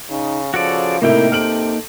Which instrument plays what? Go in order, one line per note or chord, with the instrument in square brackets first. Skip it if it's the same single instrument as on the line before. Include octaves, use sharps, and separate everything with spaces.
[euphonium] C#3 [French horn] D#4
[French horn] C#3 [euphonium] F3 [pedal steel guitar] F#4 A4 D5
[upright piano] A2 C3 A3 [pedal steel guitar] A#3 D#4 G5 [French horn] E4 [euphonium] A#4
[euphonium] C3 [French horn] A4 [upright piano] F6 D7 F#7